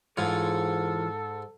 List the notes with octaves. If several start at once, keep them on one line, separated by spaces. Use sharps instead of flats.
G#2 E3 F4 A4 C#5